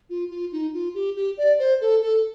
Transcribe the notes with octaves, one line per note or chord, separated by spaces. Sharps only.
F4
F4
D#4
F4
G4
G4
D5
C5
A4
A4